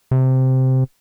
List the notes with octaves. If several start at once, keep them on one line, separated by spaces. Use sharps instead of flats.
C3